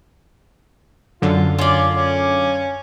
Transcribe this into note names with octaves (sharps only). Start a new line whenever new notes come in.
F#2 D3 F4
C#4 F4 D5
C#4